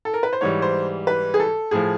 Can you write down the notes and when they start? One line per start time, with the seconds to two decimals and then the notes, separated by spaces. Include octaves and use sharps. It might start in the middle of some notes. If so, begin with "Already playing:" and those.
0.05 A4
0.14 A#4
0.23 B4
0.33 C5
0.41 G#2 E3 G3 C#5
0.62 C5
1.07 B4
1.34 G#4
1.40 A4
1.71 A2 F3 G#4